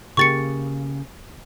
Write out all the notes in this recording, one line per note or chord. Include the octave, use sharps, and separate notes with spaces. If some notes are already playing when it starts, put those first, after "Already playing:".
C#3 A#3 G4 C#6 A6 C#7